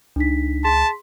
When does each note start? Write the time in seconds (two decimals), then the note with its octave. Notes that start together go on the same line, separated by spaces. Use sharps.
0.16 C#2 D4 D#4 B6
0.64 G#4 A5 C6 B6